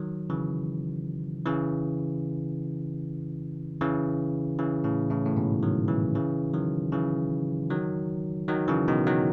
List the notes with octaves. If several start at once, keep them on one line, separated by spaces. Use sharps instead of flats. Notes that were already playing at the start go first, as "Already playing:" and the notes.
Already playing: D#3 F#3
C#3 E3
C#3 E3
C#3 E3
C#3 E3
A2 C#3
A2 C#3
A2
G#2 B2
D#3 F#3
C#3 E3
C#3 E3
D#3 F#3
C#3 E3
D#3 F#3
D#3 F#3
C#3 E3
B2 D#3
D#3 F#3